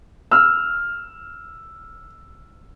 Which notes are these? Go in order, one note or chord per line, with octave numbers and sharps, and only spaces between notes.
E6 F6